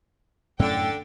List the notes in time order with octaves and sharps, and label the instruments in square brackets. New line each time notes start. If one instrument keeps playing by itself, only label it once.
[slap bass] F#2 A2 C#4 [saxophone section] D3 [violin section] G5 A6